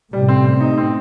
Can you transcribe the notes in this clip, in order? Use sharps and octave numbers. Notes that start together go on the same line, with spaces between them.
A2 C3 G3
C4
C4
D#4
C4